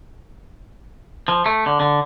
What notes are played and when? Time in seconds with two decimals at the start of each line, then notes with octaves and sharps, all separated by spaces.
1.28 F3
1.46 A3
1.66 D3
1.80 D3